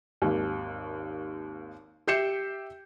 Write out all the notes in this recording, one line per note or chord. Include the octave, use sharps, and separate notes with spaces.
G#1 D#2
G4 E5 G6 C7 C#7 E7